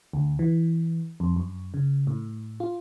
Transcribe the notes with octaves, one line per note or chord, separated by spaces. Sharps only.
D2
E3
F2
F#2
C#3
A2
F4